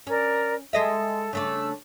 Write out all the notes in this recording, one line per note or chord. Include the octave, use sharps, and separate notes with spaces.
C#4 A#4 D5
G#3 A4 D#5 E5
C#3 A3 D4 E6